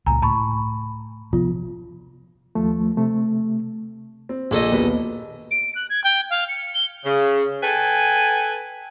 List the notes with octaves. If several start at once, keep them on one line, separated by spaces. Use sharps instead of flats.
C#2 A#2 G#5 A#5
A2 A5 B5 C#6
C3 F3 B3 F4
D#2 F3 A3
C3 A3
C4
A#1 A#2 A4 D#5
D#2 B2 B4
D7
F#6
G#6
G5
F5
C#7
G7
C#3
A4 B4 G5 G#5